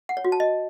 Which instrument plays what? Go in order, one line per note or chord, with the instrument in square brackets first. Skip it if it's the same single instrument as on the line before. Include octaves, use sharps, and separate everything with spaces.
[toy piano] F#5
C#5
F#4
A5
D#5